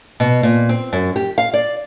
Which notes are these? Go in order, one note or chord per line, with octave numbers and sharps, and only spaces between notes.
B2
A#2
C4
F#2
G4
F5
D5